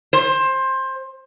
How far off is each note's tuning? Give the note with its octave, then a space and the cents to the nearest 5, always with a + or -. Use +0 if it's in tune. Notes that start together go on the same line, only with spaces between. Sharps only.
C5 +20